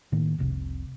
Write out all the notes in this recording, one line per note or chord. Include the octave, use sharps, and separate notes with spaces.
A2 D#3 A#3
F1 C2 C3